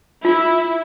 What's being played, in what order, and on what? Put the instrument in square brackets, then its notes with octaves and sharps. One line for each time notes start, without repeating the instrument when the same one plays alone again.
[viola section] E4 [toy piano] F4